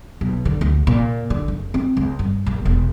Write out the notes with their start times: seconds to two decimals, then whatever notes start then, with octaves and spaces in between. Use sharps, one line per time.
0.21 B1
0.45 D3
0.61 D2
0.87 A#2
1.30 D3
1.48 F#1
1.74 C4
1.97 C#2
2.19 G2
2.46 A#1
2.65 E1